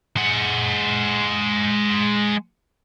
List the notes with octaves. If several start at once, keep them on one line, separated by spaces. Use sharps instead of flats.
G#3 F#5